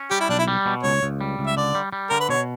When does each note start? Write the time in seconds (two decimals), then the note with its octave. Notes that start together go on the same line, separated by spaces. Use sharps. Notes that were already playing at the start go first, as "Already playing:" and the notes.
Already playing: C#4
0.11 G3 G4
0.20 E4
0.29 B1 D4
0.39 E4
0.48 G3
0.66 B2
0.83 C#2 C#5
1.03 C#2
1.21 G3
1.39 C#2
1.47 E5
1.57 D3 D5
1.75 G3
1.93 G3
2.10 D3 A#4
2.20 B4
2.29 B2 C#5